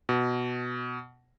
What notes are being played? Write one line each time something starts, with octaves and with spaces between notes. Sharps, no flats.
B2